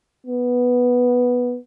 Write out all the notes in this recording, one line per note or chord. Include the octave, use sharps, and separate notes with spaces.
B3